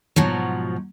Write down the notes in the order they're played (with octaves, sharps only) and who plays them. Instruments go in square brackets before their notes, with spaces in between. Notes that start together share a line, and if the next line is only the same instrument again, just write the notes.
[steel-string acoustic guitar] G#2 B2 F3 F#3